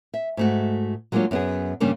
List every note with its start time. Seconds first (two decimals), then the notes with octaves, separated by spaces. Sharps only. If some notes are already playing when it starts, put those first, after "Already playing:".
0.14 E5
0.37 G#2 A3 F#4
1.12 F#3 G#3 A#3 D4 F4 C#5
1.31 F#2 B3 G#4
1.80 G2 C#3 G3 A#3 C#4 D4